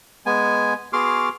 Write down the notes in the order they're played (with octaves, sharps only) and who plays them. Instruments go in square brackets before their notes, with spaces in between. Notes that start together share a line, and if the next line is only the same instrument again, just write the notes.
[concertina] G#3 B3 G#5
B3 F#4 G#4 C6 D6 F6